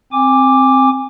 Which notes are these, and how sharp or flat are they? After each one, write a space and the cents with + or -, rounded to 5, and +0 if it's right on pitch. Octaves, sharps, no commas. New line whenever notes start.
C4 +0 G#5 -20 D6 +0